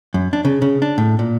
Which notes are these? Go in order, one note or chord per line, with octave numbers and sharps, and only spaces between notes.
F#2
D4
C#3
C#3
D4
A2
A#2